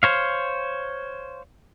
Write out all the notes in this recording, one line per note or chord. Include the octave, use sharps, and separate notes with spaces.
C5 C#5 F5